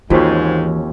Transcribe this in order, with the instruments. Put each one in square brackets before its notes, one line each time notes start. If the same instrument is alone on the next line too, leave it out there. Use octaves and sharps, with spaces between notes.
[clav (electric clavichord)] D#2 C4 C#4 [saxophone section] G#2 [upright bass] E3 [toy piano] F4 F#4 C5